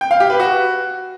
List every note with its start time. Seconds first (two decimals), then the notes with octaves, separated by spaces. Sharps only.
0.01 G5
0.11 F5
0.20 G4
0.30 B4
0.40 F#4